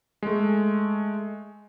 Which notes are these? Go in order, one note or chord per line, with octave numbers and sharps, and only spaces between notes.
G#3 A3